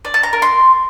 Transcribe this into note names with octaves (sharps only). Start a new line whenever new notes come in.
D5
A5
A#5
A#4
C6